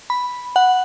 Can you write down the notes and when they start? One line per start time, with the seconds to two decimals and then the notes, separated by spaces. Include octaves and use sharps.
0.10 B5
0.56 F#5